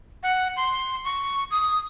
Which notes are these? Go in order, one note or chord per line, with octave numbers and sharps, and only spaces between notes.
F#5
C6
C#6
D#6